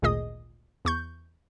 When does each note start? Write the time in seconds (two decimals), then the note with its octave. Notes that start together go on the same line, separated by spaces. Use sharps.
0.02 G#1 D2 A#2 G#4 D#5 D#6
0.85 E2 C#6 G6